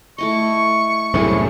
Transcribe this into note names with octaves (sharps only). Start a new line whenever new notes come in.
A3 E4 D#5 C#6
C2 F#2 A2 C3 E4 G#4